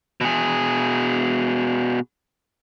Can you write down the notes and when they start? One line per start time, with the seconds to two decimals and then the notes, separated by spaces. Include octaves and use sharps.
0.21 B2 G#4